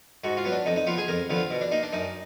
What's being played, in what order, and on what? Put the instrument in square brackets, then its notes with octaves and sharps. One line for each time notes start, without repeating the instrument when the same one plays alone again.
[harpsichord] G#2 F#4
F4
F#3 B3
D4
F2 D#4
D#4
F3 B3 F4
G#4
F2 A#4
D3 F3 B3
F4
B2
D4
A#3 D#4
D4
F#2 D#4